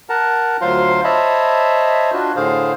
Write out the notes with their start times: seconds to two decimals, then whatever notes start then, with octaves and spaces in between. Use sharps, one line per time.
0.09 A#4 F#5 A5 A#5
0.61 D2 F#3 F4 C5 F5 C6
1.04 C5 C#5 D#5 E5 A5 B5
2.13 D4 F4 F#4
2.36 A2 D3 G#4 C5 F5